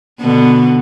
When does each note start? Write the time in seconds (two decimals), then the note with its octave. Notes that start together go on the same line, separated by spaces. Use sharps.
0.20 B2 D3 B3